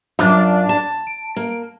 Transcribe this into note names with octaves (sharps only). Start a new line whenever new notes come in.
F#2 D4 F4 F5
A5
D7
A#3